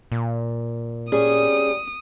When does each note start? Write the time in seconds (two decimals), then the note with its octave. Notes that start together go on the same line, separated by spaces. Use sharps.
0.12 A#2
1.12 G3 C#4 G#4 D#6